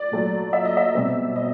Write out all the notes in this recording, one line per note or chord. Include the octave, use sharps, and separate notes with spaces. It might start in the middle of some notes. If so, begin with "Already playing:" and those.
Already playing: D5
A#2 F#3 A3
E5
D#5
E5
B2 G3 C4
D#5